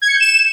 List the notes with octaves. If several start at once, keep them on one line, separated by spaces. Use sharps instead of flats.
G#6
C#7
G6
E7